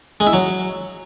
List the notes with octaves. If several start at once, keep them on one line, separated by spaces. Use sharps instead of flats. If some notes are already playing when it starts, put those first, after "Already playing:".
G#3
E4
F#3